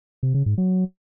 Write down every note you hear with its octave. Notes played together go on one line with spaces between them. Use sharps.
C3
C#3
G#2
F#3